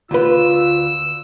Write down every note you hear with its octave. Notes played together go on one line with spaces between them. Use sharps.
D2 F4 B4 E6